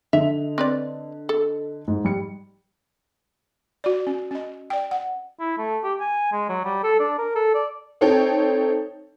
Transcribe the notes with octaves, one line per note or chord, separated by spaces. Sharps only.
D3 D#5 E5 F7
C4 B4 D5
A4
G#2
G3 C#7
F#4 D5
C#4
C#4 D#5
D5 G5
F#5
E4
A3
G4
G#5
G#3
F#3
G3
A4
D4
A#4
A4
D5
C4 D#4 A4 C#5 G5